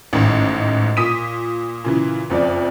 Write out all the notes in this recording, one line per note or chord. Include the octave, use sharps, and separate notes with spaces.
A1 G#2 D#3
A#2 D#6 B6 D#7
A#2 C#3 E3
F#1 F2 D5